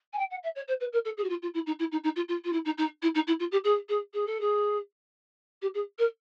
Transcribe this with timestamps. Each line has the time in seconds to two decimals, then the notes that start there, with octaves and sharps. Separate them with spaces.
0.13 G#5
0.18 G5
0.30 F#5
0.43 E5
0.55 C#5
0.67 C5
0.80 B4
0.92 A#4
1.05 A4
1.17 G#4
1.23 F#4
1.29 F4
1.42 F4
1.54 E4
1.66 D#4
1.79 E4
1.91 D#4
2.03 D#4
2.16 F4
2.28 F4
2.44 F4
2.52 E4
2.65 D#4
2.77 D#4
3.02 E4
3.14 D#4
3.27 E4
3.39 F4
3.51 G4
3.64 G#4
3.88 G#4
4.13 G#4
4.26 A4
4.40 G#4
5.61 G4
5.74 G#4
5.98 A#4